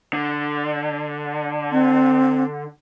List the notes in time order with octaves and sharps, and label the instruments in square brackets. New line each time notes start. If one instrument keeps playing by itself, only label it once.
[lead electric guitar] D3
[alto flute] C4